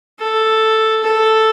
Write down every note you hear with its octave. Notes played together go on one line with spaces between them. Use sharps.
A4
A4